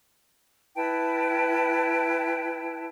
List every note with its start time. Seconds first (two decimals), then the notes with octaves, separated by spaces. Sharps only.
0.76 E4 B4 G5 A5